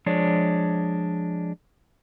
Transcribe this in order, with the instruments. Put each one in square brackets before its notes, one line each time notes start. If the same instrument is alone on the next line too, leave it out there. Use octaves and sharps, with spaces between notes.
[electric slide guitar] F3 G#3 D4 C#5